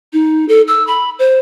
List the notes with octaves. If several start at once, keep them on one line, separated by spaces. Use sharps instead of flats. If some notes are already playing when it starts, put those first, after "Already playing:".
D#4
A4
E6
B5
C5